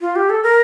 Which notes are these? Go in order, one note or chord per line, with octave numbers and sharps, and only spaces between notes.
F4
G4
A4
A#4